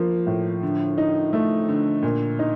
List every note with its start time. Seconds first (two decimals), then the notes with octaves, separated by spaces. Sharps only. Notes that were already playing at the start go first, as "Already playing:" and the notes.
Already playing: F3 A#3
0.27 A2
0.63 D3
0.98 D#4
1.33 A3
1.68 D3
2.03 A#2
2.39 D#4